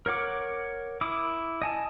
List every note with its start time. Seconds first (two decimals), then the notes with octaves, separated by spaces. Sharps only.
0.06 A#4 C#5 F#5 D6
1.01 E4 D6 D#6
1.62 D#5 G#5 A5